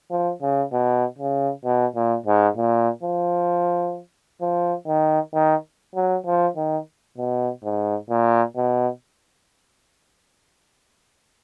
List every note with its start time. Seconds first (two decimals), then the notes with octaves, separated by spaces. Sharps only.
0.11 F3
0.42 C#3
0.73 B2
1.19 C#3
1.65 B2
1.96 A#2
2.26 G#2
2.57 A#2
3.03 F3
4.42 F3
4.87 D#3
5.34 D#3
5.95 F#3
6.26 F3
6.56 D#3
7.18 B2
7.64 G#2
8.10 A#2
8.56 B2